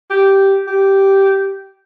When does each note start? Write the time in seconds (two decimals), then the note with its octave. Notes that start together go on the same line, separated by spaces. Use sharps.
0.10 G4
0.67 G4